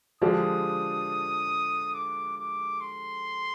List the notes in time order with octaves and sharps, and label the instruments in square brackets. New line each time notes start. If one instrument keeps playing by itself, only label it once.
[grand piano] D3 F3 G#3 D4 G4 [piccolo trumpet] D#6
[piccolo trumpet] D6
D6
C6